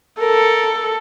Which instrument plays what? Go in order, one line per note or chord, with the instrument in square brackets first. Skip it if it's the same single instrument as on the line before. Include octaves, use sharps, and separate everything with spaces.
[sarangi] A4 [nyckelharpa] A#4